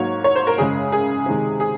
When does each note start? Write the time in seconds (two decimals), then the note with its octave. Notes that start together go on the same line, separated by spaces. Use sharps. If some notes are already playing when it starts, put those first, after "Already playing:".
Already playing: G#2 F#3 A#3 C#5
0.24 C#5
0.35 C5
0.47 A#4
0.58 F#2 C#3 G#3 G#4
0.92 G#4
1.26 C3 D#3 G#3
1.60 G#4